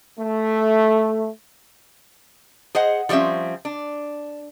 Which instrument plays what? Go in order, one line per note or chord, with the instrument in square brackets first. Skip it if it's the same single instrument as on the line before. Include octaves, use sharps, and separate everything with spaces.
[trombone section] A3
[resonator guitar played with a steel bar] G#4 C5 D#5 F#5
F3 G3 C4 C#4 E5
D4